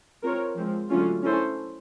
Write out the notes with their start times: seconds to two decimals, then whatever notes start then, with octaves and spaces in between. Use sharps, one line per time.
0.23 C4 F4 A#4 C#5
0.56 F3 G#3 C4
0.90 D3 F#3 A3 C#4 F4
1.23 C#4 E4 A4 C5